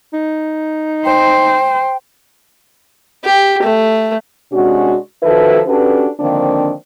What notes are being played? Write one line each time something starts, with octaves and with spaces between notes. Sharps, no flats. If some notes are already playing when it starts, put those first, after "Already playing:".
D#4
C5 G5
G4
A3
C3 G#3 C#4 D4 F#4
D#3 F3 E4 F#4 A4 B4
C#4 D4 F#4 G4 A4 B4
D3 D#3 F3 A#3 C4 D4